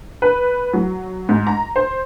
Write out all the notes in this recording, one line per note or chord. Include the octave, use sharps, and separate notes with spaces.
B4
F#3
G#2
A#5
C5